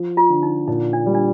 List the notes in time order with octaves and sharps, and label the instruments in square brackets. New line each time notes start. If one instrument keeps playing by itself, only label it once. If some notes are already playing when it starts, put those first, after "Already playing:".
Already playing: [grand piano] F3
[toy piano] F4
[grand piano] D3
[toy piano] D#4
[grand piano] A#2 [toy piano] D#4
[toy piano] D4
[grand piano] G3
[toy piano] D4